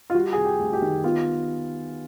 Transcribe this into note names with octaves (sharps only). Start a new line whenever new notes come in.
F4
G3 F#4
C3 G#4
G4
D2
G4
D#3
B3 F4